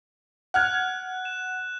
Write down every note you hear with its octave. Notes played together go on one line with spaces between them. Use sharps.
F#5 F6 F#6 G#6
E7